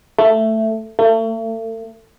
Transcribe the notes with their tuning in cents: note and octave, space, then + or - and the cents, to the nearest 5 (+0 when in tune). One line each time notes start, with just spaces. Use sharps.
A3 +10
A3 +40